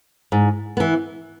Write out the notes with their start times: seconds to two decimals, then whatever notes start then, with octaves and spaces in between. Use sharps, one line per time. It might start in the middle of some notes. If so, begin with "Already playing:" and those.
0.32 G#2
0.77 E3 B3